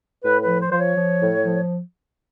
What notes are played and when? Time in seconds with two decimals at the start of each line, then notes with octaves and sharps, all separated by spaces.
0.23 A2 B4
0.41 B4
0.47 F3
0.60 C5
0.72 F3 C5
0.78 C#5
0.96 F3
1.21 A2
1.44 F3